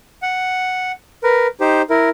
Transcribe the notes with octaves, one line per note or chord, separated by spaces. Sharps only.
F#5
A#4 B4
D#4 G4 C5
E4 A#4